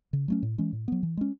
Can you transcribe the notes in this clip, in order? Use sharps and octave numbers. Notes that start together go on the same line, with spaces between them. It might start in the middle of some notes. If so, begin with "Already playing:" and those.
C#3
F#3 A3 C#4
A2
E3 G#3 C#4
A2
F#3 B3
E3
G#3 C#4